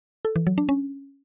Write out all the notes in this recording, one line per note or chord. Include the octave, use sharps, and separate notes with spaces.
A4
E3
F#3
D4
C#4